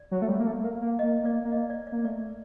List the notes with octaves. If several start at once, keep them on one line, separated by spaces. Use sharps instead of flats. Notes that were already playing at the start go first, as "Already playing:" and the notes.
Already playing: D5
F#3
A3
G3
A#3
A3
A#3
A#3
A#3 D#5
A#3 D5
A#3
D#5
D5
D5
A#3
A3 D5